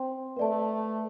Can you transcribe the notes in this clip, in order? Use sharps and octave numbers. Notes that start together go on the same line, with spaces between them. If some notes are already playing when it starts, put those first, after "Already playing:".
Already playing: C4 C5 G5 C6
A3 B4 D5 A5